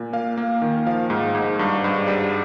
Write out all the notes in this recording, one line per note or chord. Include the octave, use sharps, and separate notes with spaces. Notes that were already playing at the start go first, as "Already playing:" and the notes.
Already playing: A#2
A#3 F5
A#3
D#3
F3 F5
G#2
G#2
G2
G2
G3